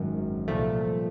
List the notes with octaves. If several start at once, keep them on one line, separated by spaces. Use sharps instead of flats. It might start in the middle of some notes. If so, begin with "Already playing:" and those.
Already playing: G#1 F#2 D#3
C2 A#2 F3 A3